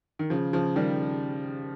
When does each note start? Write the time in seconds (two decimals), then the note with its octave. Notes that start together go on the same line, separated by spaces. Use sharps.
0.19 D#3
0.30 C#3 F3
0.53 C#3 F3
0.76 D#3 G3